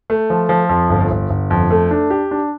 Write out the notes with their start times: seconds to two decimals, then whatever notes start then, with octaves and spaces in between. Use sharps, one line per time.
0.10 A3
0.30 F3
0.49 F3
0.69 F2
0.90 G1
1.11 G1
1.30 G1
1.51 F2
1.70 A3
1.91 D4
2.10 G4
2.31 D4